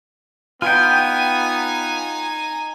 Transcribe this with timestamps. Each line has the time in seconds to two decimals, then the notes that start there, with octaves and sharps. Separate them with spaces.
0.62 B3 D#4 F4 G5 G#5